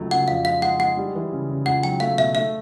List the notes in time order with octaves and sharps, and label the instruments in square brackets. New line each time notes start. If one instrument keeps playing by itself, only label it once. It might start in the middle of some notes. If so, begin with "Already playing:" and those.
Already playing: [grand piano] C#2 C#3 F#3 A3
[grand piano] C#3 [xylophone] F#5
[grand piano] F2 [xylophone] F5
[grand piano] G#3 [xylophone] F5
[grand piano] G#3 [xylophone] F#5
[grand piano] G#3 [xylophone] F#5
[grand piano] G3
E3
C#3
C#3
[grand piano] C#2 [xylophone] F#5
[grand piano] F#3 [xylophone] G5
[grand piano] A3 [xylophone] F5
[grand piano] B2 [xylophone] E5
[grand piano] A3 [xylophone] E5